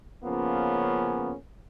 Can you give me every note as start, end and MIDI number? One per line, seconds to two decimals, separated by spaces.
0.24 1.34 49
0.24 1.34 53
0.24 1.34 58
0.24 1.34 59
0.24 1.34 61
0.24 1.34 65